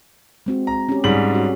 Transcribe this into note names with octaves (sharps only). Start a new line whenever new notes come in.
G#3 C4 F#4
A#5
C#4 G4
G#2 G3 G#4 F#7
C#4 F#4